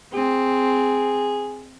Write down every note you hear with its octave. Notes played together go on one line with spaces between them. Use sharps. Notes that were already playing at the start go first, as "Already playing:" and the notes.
C4 G#4